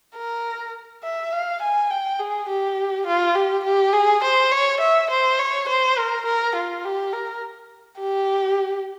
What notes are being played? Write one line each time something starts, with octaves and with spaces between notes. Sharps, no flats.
A#4
E5
F5
G#5
G5
G#4
G4
F4
G4
G4
G#4
C5
C#5
E5
C5
C#5
C5
A#4
A#4
F4
G4
A#4
G4